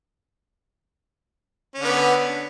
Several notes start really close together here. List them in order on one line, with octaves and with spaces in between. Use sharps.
C#4 D3 B3